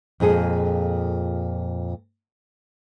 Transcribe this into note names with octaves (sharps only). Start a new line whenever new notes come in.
F2 A#2 G#3 G#4 A4